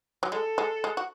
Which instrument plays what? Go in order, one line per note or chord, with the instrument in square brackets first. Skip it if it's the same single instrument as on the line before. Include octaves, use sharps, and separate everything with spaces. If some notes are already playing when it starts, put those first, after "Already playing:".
[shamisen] F#3
[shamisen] G#3 [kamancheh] A4
[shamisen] G#3
G#3
F#4